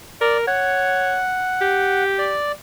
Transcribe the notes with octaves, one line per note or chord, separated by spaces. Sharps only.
A#4 D5
C#5 F#5
G4
D5